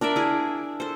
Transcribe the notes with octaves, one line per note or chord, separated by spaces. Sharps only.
D4 A#4 D5 E5
E4 G#4
A4 C5